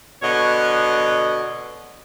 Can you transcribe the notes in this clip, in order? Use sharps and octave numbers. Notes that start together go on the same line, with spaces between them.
B2 D3 C#5 D#5